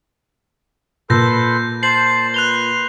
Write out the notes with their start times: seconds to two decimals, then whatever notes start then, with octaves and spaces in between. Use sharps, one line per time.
1.10 A#2 A4 B4 C6 G6 A#6
1.83 C5 A5 C7 F#7
2.34 B4 C6 F#6 F7 G7